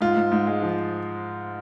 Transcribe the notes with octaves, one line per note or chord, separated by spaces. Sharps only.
G#2 F4
G#2
G#2
G#3
F3